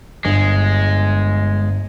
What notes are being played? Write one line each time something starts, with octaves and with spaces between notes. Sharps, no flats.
G1 G#3